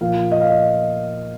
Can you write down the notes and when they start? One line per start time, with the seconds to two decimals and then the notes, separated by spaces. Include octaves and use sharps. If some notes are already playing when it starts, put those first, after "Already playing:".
0.01 A#2 F3 A#3 F5
0.32 D#5
0.41 F5
0.50 D#5